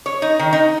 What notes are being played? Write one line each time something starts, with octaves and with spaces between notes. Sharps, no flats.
C#5
D#4
D#3
D#4